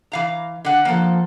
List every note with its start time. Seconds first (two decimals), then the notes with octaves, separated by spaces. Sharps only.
0.12 E3 F5 A#5
0.65 D3 F#5
0.85 F3 A#3 A4